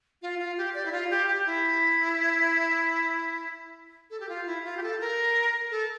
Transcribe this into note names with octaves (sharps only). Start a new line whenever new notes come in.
F4
F4
G4
D5
E4
F4
G4
G4
E4
A4
G4
F4
E4
F4
G4
A4
A#4
A4